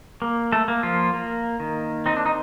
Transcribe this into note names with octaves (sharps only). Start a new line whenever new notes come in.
A#3
A3 A4
A#3
F3 F4
A#3
D#3
C4 D#4
D4
D#4